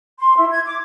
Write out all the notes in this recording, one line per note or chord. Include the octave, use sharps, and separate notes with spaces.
C6
E4
G#6
D6